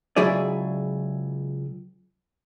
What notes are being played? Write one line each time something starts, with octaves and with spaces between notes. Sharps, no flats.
C#2 F#3 E4 G#4 D5